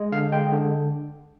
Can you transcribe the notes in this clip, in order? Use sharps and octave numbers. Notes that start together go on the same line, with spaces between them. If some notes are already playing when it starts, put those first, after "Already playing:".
Already playing: G#3
D3 F5
G#3 G5
D3